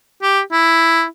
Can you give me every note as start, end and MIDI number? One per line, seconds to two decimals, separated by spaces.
0.22 0.40 67
0.52 1.04 64